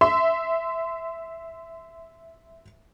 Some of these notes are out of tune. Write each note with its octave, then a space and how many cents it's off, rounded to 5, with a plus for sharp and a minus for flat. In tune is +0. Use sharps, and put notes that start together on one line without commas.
E5 +0 C6 -25